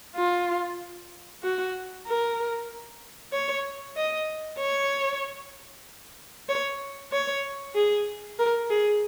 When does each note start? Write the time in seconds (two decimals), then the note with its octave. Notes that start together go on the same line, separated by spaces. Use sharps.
0.16 F4
1.43 F#4
2.06 A#4
3.33 C#5
3.96 D#5
4.59 C#5
6.49 C#5
7.12 C#5
7.75 G#4
8.39 A#4
8.70 G#4